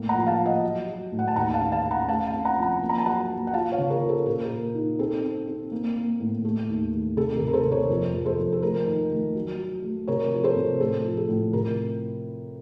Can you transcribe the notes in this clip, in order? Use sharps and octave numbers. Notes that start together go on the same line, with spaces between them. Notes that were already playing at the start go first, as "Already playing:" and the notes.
Already playing: A2 A#3
F#5 A#5
F3
F5 A5
F3
D#5 F#5
F#3
F#3
A2
F#5
A5
D#2 F#5 A#5
F5 A5
C#4
F5 A5
C#4
F#5 A#5
A3 F5 A5
F5 A5
C4
F#5 A#5
F3
F#5 A#5
A#3
A#5
A5
F#3 F#5 A#5
A#3
F#5
F4 F5 A5
C#5 F5
C#3
A#4 C#5
F4
A4 C5
A#2 A#4
A#4
A#2
D#4
C4 A4
C4
C4
A#3
A#3
A2
A3
D#2
A3
C3 A4
A#4
C3
A#4
A4 C5
C3
A#4 C#5
F2 A#4
F2
A4 C5
F2
A4
A3 A#4
D#3
A3
F#3
F#3
A3
C3 A#4 C#5
F3 C#5
A4 C5
C3
A2 A4
F3
A4
A2
C3 A#4